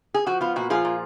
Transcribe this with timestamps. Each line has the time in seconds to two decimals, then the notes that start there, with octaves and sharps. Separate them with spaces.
0.14 G#4
0.26 F3 F#4
0.41 B3 F4
0.56 A#2 F#4
0.70 F3 F4 G#4
0.85 A#2